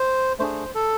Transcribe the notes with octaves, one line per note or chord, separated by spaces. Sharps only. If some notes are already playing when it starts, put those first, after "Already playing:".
Already playing: C5
A3 D4 G#4 C5
A4